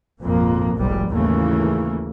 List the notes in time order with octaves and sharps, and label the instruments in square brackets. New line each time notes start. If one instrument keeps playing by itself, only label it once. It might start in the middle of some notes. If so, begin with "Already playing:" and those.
[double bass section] G#1 F2 A#2 F3 A#3
F1 B1 F2 G#2 G3
G#1 D#2 C#3 E3 A3 A#3